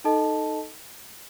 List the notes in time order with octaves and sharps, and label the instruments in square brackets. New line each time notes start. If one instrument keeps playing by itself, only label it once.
[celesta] D#4 A4 D#5 A5